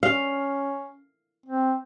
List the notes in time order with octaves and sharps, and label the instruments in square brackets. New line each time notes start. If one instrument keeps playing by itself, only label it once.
[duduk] C#4 [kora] F5
[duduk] C4